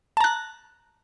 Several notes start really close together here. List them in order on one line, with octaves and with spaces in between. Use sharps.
A5 A#5 F#6